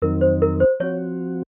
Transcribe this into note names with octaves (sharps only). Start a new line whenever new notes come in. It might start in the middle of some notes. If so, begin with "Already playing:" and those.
F2 D#3 F#3 C4 D#4 A#4
C5
A#4
C5
F3 C4 F#4 C#5